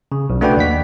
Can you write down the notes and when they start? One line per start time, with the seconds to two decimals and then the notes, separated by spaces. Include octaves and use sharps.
0.12 C#3
0.30 B1
0.41 A3 D4 F#4 B4 D5 G5
0.57 D#2 F#5 B6